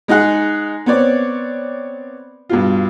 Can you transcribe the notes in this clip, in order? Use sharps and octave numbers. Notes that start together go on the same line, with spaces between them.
G#3 D#4 G#4 F#5
B3 C4 C#5 D5
G2 B2 F4